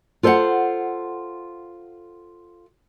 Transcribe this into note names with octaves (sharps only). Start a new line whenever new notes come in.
F4 A4 C5 D5 F#5